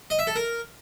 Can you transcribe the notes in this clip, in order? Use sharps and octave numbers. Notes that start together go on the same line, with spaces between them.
D#5
E5
A4
A#4